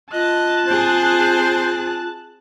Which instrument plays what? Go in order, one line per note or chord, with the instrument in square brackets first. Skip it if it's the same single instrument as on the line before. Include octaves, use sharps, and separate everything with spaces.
[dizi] F4 [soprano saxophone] D#5 [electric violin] A5 F#6
[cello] C4 G#4 [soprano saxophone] C5